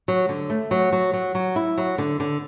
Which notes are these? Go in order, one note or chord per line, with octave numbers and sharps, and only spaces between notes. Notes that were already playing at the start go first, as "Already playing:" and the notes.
F#3
D3
A3
F#3
F#3
F#3
F#3
E4
F#3
D3
D3